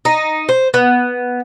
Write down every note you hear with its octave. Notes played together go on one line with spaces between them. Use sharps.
D#4
C5
B3